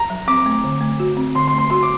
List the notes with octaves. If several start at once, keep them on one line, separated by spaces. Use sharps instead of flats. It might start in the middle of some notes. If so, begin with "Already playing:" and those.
Already playing: A#5
F#3
C4 D6
A3
D3
A3
F#4
C4
D3 C6
C6
A3
C6
F#4 C6
D6